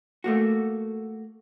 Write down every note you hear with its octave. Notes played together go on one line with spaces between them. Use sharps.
A3 A#3 F#4